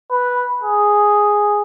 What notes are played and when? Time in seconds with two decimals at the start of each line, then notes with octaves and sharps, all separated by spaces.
0.11 B4
0.62 G#4